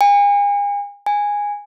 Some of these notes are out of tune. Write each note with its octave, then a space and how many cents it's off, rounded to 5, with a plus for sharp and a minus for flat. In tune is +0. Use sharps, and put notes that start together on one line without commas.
G#5 -40
G#5 -10